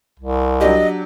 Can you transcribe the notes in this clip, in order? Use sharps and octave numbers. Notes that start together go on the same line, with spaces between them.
C2
F#3 D4 G4 D#5